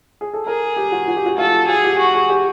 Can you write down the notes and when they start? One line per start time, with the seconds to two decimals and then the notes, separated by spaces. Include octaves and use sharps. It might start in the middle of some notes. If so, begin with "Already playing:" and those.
0.21 G#4
0.33 A4
0.46 G#4 A#4
0.76 G4
0.92 F#4
1.08 F#4
1.16 G4
1.26 F#4
1.38 F4 A4
1.68 F#4 G#4
1.84 G4
1.99 F#4
2.14 G#4
2.30 G4